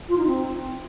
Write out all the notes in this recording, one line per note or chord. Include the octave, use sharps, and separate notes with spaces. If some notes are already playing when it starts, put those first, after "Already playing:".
F4
D#4
C4